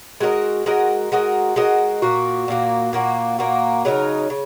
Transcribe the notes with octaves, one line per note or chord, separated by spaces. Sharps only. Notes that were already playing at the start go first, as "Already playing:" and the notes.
G#3 F#4 A#4 D#5
G#3 F#4 A#4 D#5
G#3 F#4 A#4 D#5
G#3 F#4 A#4 D#5
A#2 A#3 F#4
A#2 A#3 F#4
A#2 A#3 F#4
A#2 A#3 F#4
C#3 F#3 D#4 A#4
C#3